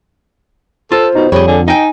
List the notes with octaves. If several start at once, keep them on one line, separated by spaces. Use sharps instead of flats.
F4 A4 C5
B2 D#4
F2 G3 G#4 C#5
D3 G#5
D#4 D#5 G5 G#5